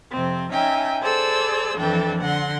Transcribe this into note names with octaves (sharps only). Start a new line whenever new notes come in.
F2 C3 C4
C#4 D#4 E5 G5 G#5
G#4 A4 C5 D5 E6
F2 E3 D4 A4 G5
D3 F#5 C6 A#6